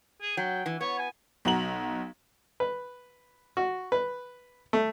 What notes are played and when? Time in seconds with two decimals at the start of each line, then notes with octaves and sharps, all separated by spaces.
0.21 G#4
0.37 F#3 G5
0.66 E3
0.81 B3 C#5
0.99 G#5
1.45 B1 F#4 A#5 F#7
2.60 B4
3.57 F#4
3.92 B4
4.73 A3